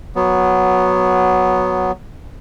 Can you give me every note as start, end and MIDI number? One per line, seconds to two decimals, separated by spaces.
0.16 1.92 54
0.16 1.92 59